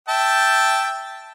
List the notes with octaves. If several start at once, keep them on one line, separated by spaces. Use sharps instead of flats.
E5 G5 A5